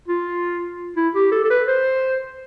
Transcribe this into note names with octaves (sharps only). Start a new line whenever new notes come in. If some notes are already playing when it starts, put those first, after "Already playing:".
F4
E4
G4
A4
A4
B4
C5